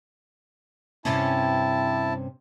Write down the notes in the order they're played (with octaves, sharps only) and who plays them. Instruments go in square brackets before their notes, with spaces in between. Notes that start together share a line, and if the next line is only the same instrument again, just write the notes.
[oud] G2 C3 C#4 [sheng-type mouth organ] E4 A5